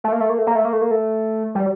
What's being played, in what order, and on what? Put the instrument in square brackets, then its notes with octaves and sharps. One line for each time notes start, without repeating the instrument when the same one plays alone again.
[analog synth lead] A3
A#3
A3
A#3
A3
A#3
A3
A#3
A3
A#3
A3
G3